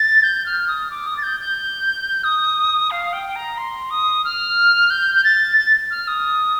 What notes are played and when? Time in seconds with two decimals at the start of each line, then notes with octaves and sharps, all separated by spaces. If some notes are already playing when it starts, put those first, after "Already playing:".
Already playing: A6
0.23 G6
0.46 F6
0.68 D#6
0.90 D6
1.07 D#6
1.17 A6
1.23 G6
1.40 G6
2.24 D#6
2.91 F5
3.13 G5
3.36 A#5
3.58 C6
3.90 D#6
4.24 F6
4.90 G6
5.15 G6
5.24 A6
5.58 A6
5.91 F6
6.08 D#6